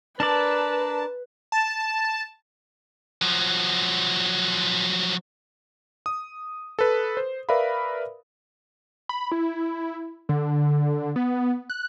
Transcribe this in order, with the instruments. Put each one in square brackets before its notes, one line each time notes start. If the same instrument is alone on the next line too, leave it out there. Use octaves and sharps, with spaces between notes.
[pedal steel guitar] D4 A#4 D5 [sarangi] B4 [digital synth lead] A5
[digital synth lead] A5
[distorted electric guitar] F3 F#3
[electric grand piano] D#6
A4 B4
C5
A#4 B4 D5 E5 F5 B5
[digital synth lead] B5
E4
D3
B3
F#6